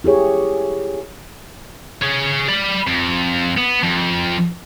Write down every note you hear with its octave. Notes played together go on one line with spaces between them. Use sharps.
E4 G4 G#4 C#5
G#4 C#5
D5 B5
F2
B3
F2